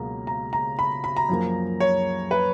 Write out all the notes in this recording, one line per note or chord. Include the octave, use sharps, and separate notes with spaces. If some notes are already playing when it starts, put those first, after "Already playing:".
Already playing: C#2 B2 F#3 A#3 A#5
A#5
A#5
B5
B5
A#5
F#2 F3 A#3
C#5
B4